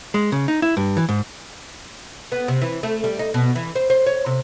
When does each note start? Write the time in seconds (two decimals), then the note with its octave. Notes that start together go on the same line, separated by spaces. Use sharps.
0.14 G#3
0.32 C#3
0.48 D#4
0.62 E4
0.77 G2
0.97 E3
1.09 G#2
2.32 B3
2.48 C3
2.61 E3
2.83 A3
3.04 G3
3.19 D#4
3.34 B2
3.55 E3
3.75 C5
3.90 C5
4.06 C#5
4.26 C3